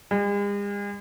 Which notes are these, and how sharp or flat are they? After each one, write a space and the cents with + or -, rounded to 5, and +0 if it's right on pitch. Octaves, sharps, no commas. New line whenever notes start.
G#3 -45